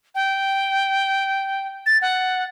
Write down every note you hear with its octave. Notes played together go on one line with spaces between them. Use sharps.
G5
A6
F#5